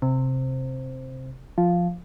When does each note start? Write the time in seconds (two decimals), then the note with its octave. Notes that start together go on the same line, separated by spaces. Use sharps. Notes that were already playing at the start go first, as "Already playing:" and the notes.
0.02 C3
1.58 F3